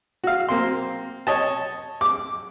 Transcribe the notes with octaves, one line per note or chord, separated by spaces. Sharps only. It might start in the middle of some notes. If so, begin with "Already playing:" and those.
F#4 F5
A#3 C4 C6
C#5 D#5 A5
D6